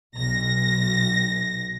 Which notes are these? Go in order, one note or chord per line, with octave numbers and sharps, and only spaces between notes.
B1 A#6